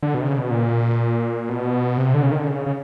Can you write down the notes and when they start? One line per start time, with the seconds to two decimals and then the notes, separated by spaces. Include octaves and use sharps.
0.03 D3
0.15 B2
0.21 C3
0.26 C#3
0.38 B2
0.51 A#2
1.49 B2
1.97 C3
2.14 D3
2.23 C#3
2.32 D#3
2.38 D3
2.48 C#3
2.66 C#3